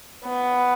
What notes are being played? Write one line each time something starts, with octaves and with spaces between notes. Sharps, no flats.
B3